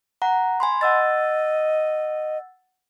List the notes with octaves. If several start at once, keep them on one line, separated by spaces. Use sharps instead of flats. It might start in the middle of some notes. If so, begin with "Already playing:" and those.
F#5 A#5
G#5 B5 C6
D#5 F#5 E6 A6